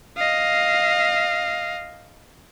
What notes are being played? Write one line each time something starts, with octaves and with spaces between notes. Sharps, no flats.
D#5 F5